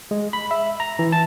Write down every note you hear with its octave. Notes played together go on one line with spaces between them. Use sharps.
G#3
B5
E5
A#5
E3
A5